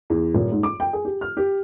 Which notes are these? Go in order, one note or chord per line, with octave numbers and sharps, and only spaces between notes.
E2
D#1
G#2
D6
G5
G#4
G4
F6
G4